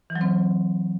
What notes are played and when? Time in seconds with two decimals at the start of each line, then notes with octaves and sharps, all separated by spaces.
0.10 E3
0.16 F#3
0.21 C4